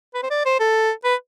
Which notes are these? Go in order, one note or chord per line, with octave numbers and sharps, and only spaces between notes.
B4
C5
D5
C5
A4
B4